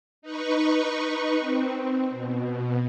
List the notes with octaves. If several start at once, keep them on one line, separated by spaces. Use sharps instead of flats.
D#4 B4 C#6
C4
B2